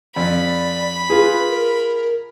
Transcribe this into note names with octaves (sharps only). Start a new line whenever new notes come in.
F2 D5 B5
F4 G#4 B4
A#4